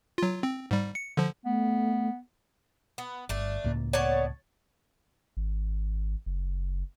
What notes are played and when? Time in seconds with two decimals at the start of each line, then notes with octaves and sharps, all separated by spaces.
0.18 F#3 F4
0.43 C4
0.71 G#2 G3
0.95 C#7
1.17 D3 F3
1.45 A3 B3
2.98 B3
3.29 G1 A3 D4
3.64 C#2 A2 A#3
3.93 B3 C#5 D5 A5
5.37 G#1
6.26 F#1